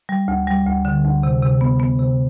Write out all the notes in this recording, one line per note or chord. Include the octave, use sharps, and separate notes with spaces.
G3
D2
G3
D2
D3
D2
C3
C3
B3
B3
C3